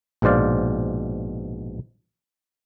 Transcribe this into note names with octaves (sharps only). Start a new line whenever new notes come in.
A#1 G#2 B2 C5 D5 F5